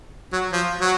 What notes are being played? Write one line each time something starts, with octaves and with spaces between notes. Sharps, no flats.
F#3
F3
F#3